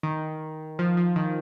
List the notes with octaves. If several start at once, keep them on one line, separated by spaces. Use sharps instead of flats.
D#3
F3
F3
D#3